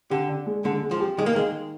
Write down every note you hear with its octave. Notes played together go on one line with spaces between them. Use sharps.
D3 G4
D4
G#3
D3 G#3
G#3
F3
G4
D#3 G#3
A#3
D#3 G#3